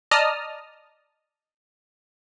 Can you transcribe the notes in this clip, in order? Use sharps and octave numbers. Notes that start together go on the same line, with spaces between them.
D5 D#5 A5 A#5 D#6 F6